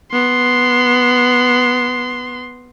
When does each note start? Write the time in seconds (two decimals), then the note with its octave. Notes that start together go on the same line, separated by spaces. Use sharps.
0.12 B3 C6